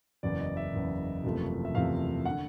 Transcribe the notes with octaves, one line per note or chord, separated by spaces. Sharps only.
F#1 E2 C#3 D5
D#5
E5
F#1 E2 C#3
F#1 E2 C3 F3 A3
E5
F#1 E2 C3 F3 A3 F5
D3 F#5